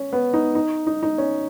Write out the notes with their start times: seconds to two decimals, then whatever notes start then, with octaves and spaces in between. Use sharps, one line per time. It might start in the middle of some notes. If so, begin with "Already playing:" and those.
Already playing: C#4
0.13 B3
0.33 D#4
0.55 D#4
0.87 D#4
1.03 D#4
1.18 C#4